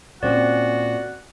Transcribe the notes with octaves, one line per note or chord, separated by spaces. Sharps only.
A#2 C4 C#4 F#4 D5